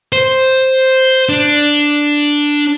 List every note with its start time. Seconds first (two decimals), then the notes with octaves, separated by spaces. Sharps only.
0.13 C5
1.29 D4